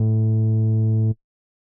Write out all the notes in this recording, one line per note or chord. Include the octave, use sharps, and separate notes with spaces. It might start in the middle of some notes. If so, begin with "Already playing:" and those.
Already playing: A2